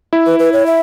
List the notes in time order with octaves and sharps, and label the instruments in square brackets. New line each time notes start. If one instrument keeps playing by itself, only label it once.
[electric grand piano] E4
[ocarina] B4
B4
C#5
E5